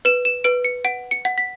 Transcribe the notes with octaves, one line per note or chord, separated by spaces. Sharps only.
B4 E7
E7
B4 D7
C#7
F#5 D7
C#7
F#5
B6